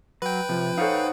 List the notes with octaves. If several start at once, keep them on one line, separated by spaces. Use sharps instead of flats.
F#3 B4 G5
C3 F3
D#4 A4 C5 C#5 F5 F#5